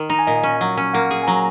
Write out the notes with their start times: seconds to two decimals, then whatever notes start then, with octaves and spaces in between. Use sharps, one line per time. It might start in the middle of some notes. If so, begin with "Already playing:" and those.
Already playing: D#3
0.10 D#4 A#5
0.19 G#5
0.27 A#2 D#5
0.43 C#4
0.61 F#3
0.77 C#4
0.94 A#3 F#5
1.11 G#4
1.23 G#5
1.27 F#3 A#5